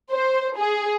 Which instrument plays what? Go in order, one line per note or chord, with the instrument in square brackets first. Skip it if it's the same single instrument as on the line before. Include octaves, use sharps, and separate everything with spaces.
[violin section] C5
G#4